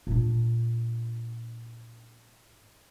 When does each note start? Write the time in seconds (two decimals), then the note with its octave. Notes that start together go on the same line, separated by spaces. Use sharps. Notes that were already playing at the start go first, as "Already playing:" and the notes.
0.07 A#2 D4